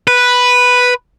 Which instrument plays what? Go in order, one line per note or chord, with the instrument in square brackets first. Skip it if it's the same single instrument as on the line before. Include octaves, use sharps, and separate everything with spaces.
[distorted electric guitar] B4